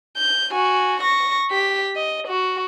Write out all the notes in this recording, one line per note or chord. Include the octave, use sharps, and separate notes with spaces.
G6
F#4 G#5
C#6 A#6
G4 B6
D#5
F#4